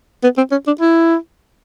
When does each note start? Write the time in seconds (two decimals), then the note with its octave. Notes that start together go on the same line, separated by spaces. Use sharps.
0.24 B3
0.38 C4
0.52 C#4
0.67 D4
0.81 E4